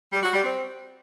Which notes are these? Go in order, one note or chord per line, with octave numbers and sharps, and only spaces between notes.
G3
F#4
G3
C4